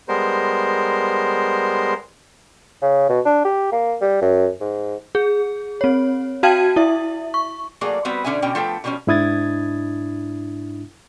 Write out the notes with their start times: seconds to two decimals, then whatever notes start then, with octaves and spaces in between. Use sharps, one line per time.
0.08 G3 G#3 B3 A#4 C5
2.82 C#3
3.09 B2
3.25 D4
3.45 G4
3.72 A#3
4.01 G3
4.22 F#2
4.61 G#2
5.15 G#4
5.81 C4 C#5
6.43 F#4 F5 G5 A5 G#6 D#7
6.76 E4 E5
7.34 C#6
7.81 F#3 A3 A#3 G#4 D5
8.05 G3 B3 C4 F#4 B4
8.24 B2 D3 C#4 E5 G#5
8.42 B2 D3 C#4 G5
8.55 F3 A3 B3 A4 G5
8.84 B2 D3 F3 G3 C#4
9.07 G#2 D4 E4 D#6 G#6 A6